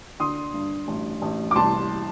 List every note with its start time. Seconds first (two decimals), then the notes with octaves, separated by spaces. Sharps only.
0.20 D3 C6 D#6
0.54 G2
0.88 A1
1.22 A1
1.51 D6
1.55 C2 A5 C6